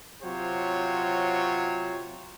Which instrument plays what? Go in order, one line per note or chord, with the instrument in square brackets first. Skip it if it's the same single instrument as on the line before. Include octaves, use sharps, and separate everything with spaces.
[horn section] C3 F#3 F4 G4 C5 C#5